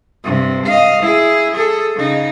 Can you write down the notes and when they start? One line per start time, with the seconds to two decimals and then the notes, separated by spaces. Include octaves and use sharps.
0.24 G2 C3
0.66 D#5 F5
1.02 E4 G#4
1.54 G#4 A4
1.96 C#3 D#4